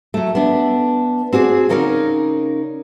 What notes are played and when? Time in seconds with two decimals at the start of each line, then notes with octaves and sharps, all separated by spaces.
0.14 F#3 A3
0.35 B3 D4
1.33 C4 F#4 G#4 D5
1.69 C#3 C#4 D#4 A#4 C#5 D5